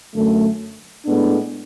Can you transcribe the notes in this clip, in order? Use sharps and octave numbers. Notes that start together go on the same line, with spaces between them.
F#2 D3 A3
A2 G#3 B3 D4